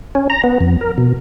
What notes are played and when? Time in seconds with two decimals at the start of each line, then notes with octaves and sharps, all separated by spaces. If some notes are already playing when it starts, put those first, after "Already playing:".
0.15 C#4
0.30 A#5
0.44 B3
0.60 F2
0.81 A#4
0.98 B2